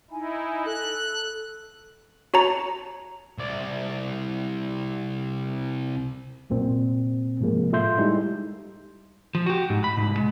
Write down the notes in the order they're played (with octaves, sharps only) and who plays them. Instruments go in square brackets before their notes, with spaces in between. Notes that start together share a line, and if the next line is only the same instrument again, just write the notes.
[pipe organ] D#4 E4 [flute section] G#5
[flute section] A4 [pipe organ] F#6
[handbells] F#4 C#5 A5 A#5 C#7
[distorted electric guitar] C2 D5
[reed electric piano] C2 F#2 A#2 C4
G#2 C3 F3 G#3 A#3
A2 F4 A4 E5 C6 G6
G3 G#3 D#4 E4
[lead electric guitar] F3
F#4 G4
G#2
B5
C2 G#2
G#3